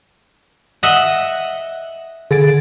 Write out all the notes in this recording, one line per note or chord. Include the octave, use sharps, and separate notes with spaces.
D#5 E5 F#5
D3 G#4 A6 D7